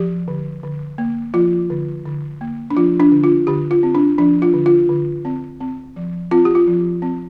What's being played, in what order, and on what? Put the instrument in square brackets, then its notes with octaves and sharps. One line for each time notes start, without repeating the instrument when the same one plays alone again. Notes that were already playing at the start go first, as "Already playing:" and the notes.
Already playing: [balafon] F3 G4
D3
D3
A#3
F3 F4
D3
D3
A#3
D4
F3 F4
D4
D3
F4
D3 G4
F4
C4
D4
F3 D4
F4
D3
F4
D3
C4
C4
F3
C4 F4
G4
F4
F3
C4